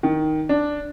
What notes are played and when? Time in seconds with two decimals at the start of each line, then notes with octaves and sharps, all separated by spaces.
0.03 D#3
0.49 D4